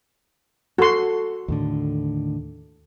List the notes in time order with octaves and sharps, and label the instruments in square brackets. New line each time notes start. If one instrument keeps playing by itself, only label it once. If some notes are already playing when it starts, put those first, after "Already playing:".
[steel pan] F#4 C6 [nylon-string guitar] A4
[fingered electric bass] D#2 A2 D3